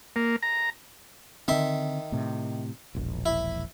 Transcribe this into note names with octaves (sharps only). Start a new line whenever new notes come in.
A#3
A#5
D3 D#3 C4 E5 C6
A2 C3
E1 A#1
E4